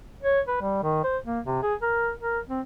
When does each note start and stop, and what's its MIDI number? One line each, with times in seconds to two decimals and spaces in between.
0.23 0.40 73
0.48 0.56 71
0.61 0.82 55
0.83 1.01 51
1.04 1.18 72
1.26 1.40 58
1.45 1.59 48
1.63 1.75 68
1.82 2.12 70
2.20 2.39 70
2.50 2.61 60